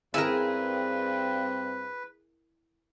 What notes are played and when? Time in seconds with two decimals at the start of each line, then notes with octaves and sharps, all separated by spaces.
0.14 G2 C4 E4 G#4 A#4 B4